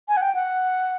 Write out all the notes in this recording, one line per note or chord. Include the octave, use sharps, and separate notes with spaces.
G#5
F#5
G5
F#5